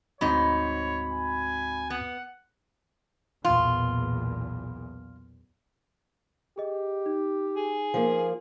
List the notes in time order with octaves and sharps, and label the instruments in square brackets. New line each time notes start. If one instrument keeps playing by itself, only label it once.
[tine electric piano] D2 C4 F#4 [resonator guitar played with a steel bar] G#2 D#4 [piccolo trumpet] C#5 [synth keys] B5
[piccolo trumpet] G#5
[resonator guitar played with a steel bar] B3 [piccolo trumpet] F#5
[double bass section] B1 E2 A#2 [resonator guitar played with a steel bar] F4
[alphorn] G4 [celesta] G#4 D#5
[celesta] D#4
[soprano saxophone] G#4
[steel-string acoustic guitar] F3 A#3